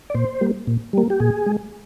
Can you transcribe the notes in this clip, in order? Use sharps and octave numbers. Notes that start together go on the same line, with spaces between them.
D5
A#2 C5
G3 A#3
A#2
G3 A#3
G4
A#2 G#4
G#3